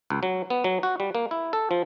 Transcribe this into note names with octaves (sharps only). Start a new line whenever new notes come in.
C#2
F#3
B3
F#3
F#4
G3
A#3
E4
A4
F3